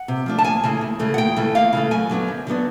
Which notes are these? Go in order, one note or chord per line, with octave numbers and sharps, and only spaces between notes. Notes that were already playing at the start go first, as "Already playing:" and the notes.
Already playing: F#5
C3
F3 A3 D4
A5
D#2 G#5
C#3 E3 A3
D#2
C#3 E3 A3
F#5
D#2 G5
C#3 E3 A3
D#2 F5
C#3 E3 A3
F#2 G#5
D3 F#3 B3 D4
F#2
D3 F#3 B3 D4